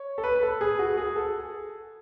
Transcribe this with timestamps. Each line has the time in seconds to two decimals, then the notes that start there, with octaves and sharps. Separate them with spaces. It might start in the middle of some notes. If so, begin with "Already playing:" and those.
Already playing: C#5
0.18 A4
0.24 B4
0.35 B4
0.43 A4
0.61 G#4
0.79 F#4
0.98 G#4
1.16 A4